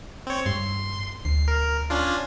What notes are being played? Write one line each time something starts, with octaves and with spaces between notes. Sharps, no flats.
C4 C#5
G2 C6
D2 C7
A#4
C#4 D4 F4